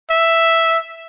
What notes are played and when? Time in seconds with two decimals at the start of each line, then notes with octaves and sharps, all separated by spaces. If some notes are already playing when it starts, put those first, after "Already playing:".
0.10 E5